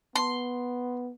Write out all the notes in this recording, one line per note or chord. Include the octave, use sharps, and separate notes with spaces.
B3 C6